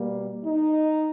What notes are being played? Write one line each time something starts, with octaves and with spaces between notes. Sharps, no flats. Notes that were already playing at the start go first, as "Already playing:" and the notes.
Already playing: B2 G3 A#3
D#4